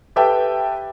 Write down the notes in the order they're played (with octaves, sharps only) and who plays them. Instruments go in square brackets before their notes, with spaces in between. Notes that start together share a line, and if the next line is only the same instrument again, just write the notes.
[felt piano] G4 A4 B4 E5 G5